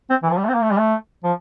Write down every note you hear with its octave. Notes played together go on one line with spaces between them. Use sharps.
C4
E3
F3
G3
A3
C4
A#3
A3
G3
A3
F3